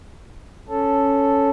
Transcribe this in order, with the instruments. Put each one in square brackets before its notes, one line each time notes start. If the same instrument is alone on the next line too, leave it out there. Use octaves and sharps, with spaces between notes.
[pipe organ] C#4 A4